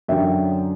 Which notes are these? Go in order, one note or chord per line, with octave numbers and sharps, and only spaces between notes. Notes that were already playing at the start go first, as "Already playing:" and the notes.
F#2 D3 F#3 E5 G5